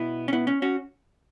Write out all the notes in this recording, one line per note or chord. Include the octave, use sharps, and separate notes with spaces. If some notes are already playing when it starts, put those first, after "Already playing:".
Already playing: B2 B3 E4
C#4
B3 E4
C#4
C#4 F#4